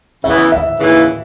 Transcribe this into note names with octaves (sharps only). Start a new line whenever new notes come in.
C#3 E3 B3 E5
E5
D#2 C#3 E3